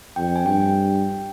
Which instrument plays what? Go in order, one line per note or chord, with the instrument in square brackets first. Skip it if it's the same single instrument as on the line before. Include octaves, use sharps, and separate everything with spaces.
[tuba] F2 [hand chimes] G5
[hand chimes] G#5
[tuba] G2 [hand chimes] G5